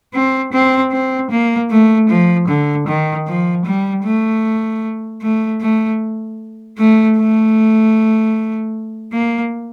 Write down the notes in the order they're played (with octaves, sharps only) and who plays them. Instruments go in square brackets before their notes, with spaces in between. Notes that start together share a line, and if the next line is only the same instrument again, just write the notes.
[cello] C4
C4
C4
A#3
A3
F3
D3
D#3
F3
G3
A3
A3
A3
A3
A3
A#3